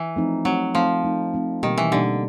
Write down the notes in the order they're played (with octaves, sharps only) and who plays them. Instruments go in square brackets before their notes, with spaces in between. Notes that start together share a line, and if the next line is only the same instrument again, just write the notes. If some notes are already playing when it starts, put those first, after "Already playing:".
Already playing: [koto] E3
[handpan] F3 A3 C4 D#4
[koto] F#3 [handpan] A3 C4 D#4
[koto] F3 [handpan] A3 C4 D#4
[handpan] A3 C4 D#4
A3 C4 D#4
[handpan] B2 G3 A#3 D#4 G4 [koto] D#3
[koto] E3
[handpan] B2 G3 A#3 D#4 G4 [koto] D3